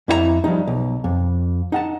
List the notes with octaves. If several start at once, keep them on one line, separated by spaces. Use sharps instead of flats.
F2 E4 B4 A#5
F3 G3 D#4
B1
F2
D#4 F#5 A5